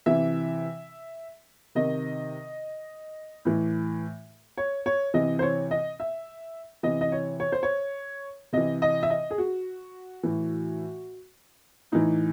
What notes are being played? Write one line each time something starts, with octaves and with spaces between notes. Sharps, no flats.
C3 E3 E5
C3 D#3 D#5
A2 E3
C#5
C#5
C3 E3 D#5
C5
C#5
D#5
E5
C3 E3 D#5
D#5
C#5
C#5
C5
C#5
C3 E3 D#5
D#5
E5
D#5
G#4
F#4
A2 E3
A2 E3 D#4